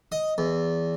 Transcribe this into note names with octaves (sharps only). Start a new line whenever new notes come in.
D#5
E2